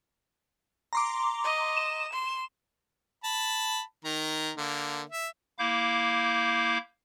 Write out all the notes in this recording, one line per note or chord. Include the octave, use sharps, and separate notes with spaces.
A#5 C6 D6
D#5
E7
C6
A5 B5
D#3 A#5
D3 A#3
E5
A#3 E4 F5 D6 G6